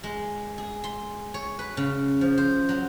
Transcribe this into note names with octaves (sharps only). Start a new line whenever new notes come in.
G#3
G#4
C6
C#5
B4
C#3
F3
C5
F#3